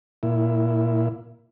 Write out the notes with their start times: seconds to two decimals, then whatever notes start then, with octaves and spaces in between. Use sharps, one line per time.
0.23 A#2 E4